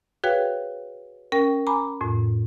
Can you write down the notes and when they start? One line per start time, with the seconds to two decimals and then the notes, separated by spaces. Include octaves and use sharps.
0.24 F#4 G#4 B4 C#5 F5 G5
1.32 C#4 A#4 G5
1.67 G#5 A#5 B5 D6
2.01 F2 A2